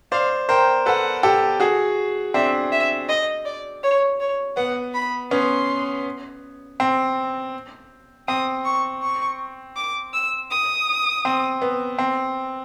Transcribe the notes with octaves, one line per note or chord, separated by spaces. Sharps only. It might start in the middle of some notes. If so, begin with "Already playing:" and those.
C5 D5 F5
A#4 C5 G5
A4 B4 F#5
G4 A4
F#4 G#4
C4 D4 E5
E5
D#5
D5
C#5
C#5
B3 F#5
B5
B3 C#4 C6
C4
C4 D#6
C#6
C#6
D6
E6
D#6
C4
B3
C4